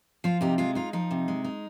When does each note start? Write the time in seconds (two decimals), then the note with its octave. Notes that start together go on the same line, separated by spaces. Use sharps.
0.24 F3 F4
0.41 C3 D#4 G4
0.58 G#3 F4
0.75 D#4 F4
0.93 F3 D#4
1.11 C3
1.28 G#3
1.44 D#4